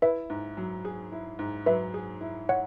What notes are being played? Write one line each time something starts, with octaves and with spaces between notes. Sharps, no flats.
E4 B4 E5
G#2
F#3
G#4
E4
G#2
F#3 B4 E5
G#4
E4
C#5 F#5